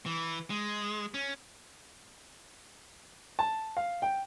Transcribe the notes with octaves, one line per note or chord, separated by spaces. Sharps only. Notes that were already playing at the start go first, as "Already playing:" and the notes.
E3
G#3
C#4
A5
F5
G5